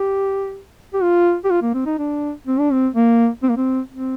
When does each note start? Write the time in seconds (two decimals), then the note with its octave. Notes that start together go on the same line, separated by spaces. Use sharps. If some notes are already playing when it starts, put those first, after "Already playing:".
Already playing: G4
0.94 G4
1.02 F4
1.44 G4
1.50 F4
1.62 A#3
1.74 C4
1.86 D#4
1.98 D4
2.47 C4
2.59 D4
2.72 C4
2.94 A#3
3.43 C4
3.49 A#3
3.57 C4
3.91 C4